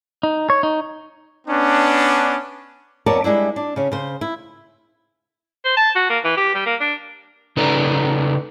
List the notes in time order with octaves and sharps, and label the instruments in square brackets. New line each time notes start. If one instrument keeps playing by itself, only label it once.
[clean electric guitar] D#4
C#5
D#4
[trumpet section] B3 C#4 D4
[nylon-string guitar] F2 B3 A#4 C#5 D5 A5
G3 G#3 D4 E4
D4
C#3 C#4
C#3 C5
E4
[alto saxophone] C5
A5
F#4
A#3
E3
G4
G3
A#3
D4
[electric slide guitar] C#3 D#4 A4 B4 D5 A#5